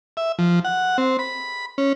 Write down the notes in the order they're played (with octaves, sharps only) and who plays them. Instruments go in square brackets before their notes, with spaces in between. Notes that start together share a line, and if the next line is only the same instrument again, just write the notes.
[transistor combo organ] E5
F3
F#5
C4
B5
C#4